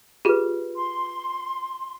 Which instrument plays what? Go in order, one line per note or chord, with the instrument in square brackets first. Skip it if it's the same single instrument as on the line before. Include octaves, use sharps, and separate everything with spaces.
[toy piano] F4 B4 [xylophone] G4 G#4
[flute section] C6